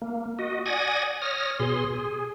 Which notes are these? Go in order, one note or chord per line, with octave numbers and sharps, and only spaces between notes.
A#3
F#4 D#5
D5 F#5 G#5 D#6 G#6 A#6
C#5 D#6 F6 A#6
B2 G#4 C6
G#4